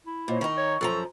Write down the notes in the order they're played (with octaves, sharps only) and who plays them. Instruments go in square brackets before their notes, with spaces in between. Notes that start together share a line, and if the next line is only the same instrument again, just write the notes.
[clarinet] E4
[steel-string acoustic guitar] A#2 [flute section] C5 C#5 D#5
[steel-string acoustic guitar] D#3 D#4 [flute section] C#6
[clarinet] C#5
[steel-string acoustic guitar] F#2 F3 A#5 [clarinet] A4